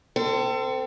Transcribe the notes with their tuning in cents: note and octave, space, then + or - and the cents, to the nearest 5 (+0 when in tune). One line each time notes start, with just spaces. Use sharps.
C4 -20 A4 +30